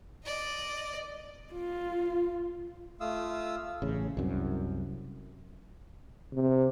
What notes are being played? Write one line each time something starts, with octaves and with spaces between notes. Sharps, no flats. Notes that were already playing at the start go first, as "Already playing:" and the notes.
D5 D#5
F4
A3 F4 F5 D#6 E6
A1 C#3
C2 F#2
C3